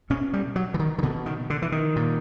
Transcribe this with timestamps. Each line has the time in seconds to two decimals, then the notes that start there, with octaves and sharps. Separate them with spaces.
0.10 B2 C#4
0.33 G3
0.56 F#3
0.74 E3
0.79 D#3
0.98 D#3
1.03 B2 D3
1.26 D#3
1.50 D3
1.62 E3
1.72 D#3
1.96 A#2